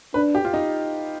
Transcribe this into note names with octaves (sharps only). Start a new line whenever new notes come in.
D4 B4
G4
F4
D#4